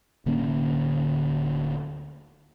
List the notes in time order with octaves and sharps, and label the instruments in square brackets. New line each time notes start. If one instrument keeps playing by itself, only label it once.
[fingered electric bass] D1 D3 A#3 C#4